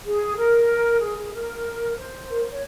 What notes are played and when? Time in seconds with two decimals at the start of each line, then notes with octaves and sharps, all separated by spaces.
0.05 G#4
0.37 A#4
1.01 G#4
1.17 G#4
1.34 A#4
1.97 C5
2.29 A#4
2.40 C5
2.51 C#5